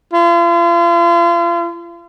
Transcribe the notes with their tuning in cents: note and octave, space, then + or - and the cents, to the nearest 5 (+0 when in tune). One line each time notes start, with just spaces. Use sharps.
F4 -40